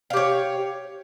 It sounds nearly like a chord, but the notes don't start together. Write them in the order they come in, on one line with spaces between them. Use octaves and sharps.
F5 G4 C#5